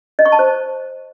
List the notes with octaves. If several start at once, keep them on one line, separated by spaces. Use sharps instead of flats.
D#5
C#6
A5
C5